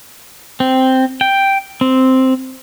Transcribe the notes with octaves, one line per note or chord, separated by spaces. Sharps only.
C4
G5
C4